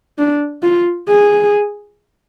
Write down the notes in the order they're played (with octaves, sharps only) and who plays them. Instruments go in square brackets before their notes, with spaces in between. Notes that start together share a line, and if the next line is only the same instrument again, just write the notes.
[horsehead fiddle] D4
F4
G#4